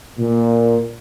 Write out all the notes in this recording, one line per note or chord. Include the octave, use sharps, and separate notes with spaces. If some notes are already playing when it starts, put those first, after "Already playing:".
A#2